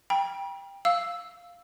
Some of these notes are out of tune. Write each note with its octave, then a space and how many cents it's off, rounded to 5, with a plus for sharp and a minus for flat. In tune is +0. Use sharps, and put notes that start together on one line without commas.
G5 +15 B5 -45
F5 +0 E6 +0